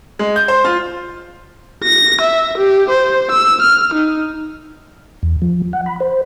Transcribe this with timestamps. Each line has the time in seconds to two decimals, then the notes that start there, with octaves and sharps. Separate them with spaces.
0.19 G#3
0.36 G6
0.48 C5
0.65 F4
1.84 A#6
2.21 E5
2.58 G4
2.90 C5
3.31 E6
3.62 F6
3.94 D#4
5.23 E2
5.42 F3
5.73 F#5
5.86 B5
6.00 C5